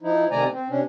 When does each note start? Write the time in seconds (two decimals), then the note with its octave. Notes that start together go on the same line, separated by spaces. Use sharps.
0.02 F3 D#4 E4
0.31 C3 D#3 A3 D5 G#5 A#5
0.52 C4
0.70 C3 C#4 D4